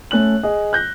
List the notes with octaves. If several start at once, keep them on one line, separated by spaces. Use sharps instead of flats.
A3 C#4 F#6 F#7
G#4 D#5
F#6 G6 A#6